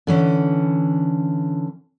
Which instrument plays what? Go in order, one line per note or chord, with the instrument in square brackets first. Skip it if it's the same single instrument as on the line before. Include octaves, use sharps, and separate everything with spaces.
[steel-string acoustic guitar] D3 E3 C#4